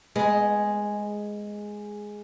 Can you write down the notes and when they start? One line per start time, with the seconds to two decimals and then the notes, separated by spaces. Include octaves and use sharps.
0.16 G#3 B3